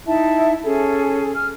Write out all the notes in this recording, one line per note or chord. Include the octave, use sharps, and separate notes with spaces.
D#4 E4 E5 A5
C#4 G#4 A4
F6